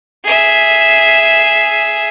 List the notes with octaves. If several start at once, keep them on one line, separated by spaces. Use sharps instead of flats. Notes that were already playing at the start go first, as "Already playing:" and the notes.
G#4 E5